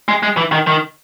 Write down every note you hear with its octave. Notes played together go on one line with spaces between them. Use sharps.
G#3
G#3
E3
D#3
D#3